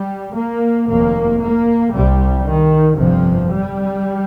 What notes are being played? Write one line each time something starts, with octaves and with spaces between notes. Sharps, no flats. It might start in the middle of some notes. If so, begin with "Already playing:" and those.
Already playing: G3
A#3
F1 D#2 A#3
A#3
C2 C3 G3
D#3
G1 F2 C3 F3
G3